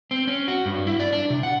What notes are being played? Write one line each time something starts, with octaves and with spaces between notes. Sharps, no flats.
C4
C#4
F#4
G2
E4
D5
D4
C3
F#5